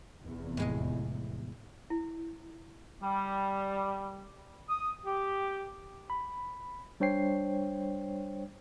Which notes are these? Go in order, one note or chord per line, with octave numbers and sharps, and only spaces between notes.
F1 E2
A2 G#3 D#5
E4
G3
D#6
G4
B5
G3 D4 C5 C#5 G5 C7